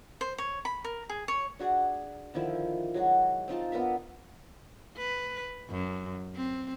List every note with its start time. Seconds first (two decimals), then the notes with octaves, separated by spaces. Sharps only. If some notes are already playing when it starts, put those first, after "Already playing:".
0.21 C5
0.38 C#5
0.65 B5
0.85 A#4
1.10 G#4
1.28 C#5
1.59 D4 F#4 G#4 D5
2.34 D3 D#3 F3 E4
2.94 F#3 G#3 F#4
3.48 C4 D#4 F4 A5
3.72 B3 D4 A#4 E5
4.98 B4
5.70 F#2
6.36 C4